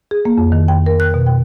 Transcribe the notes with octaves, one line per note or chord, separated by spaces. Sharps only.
G#4
A#3
F2
D#3
G5
A#4
F#6
B2
G5